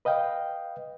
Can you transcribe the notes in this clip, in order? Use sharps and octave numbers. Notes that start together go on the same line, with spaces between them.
B4 D#5 F5 G5